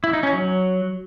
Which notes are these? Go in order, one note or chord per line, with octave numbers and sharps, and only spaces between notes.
E4
D#4
C#4
F#3